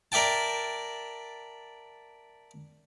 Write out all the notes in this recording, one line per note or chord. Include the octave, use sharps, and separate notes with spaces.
A#4 D5 E5 G5 A5